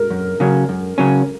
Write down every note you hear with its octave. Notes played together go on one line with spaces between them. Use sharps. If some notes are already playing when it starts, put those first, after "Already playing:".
Already playing: A#4
F#2
C#3 F#3 C#4
F#2
C#3 F#3 C#4